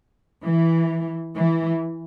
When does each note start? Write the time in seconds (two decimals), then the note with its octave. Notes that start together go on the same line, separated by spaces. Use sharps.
0.41 E3
1.33 E3